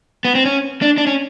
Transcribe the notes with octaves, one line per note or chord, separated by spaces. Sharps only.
B3
C4
C#4
D4
D4
C#4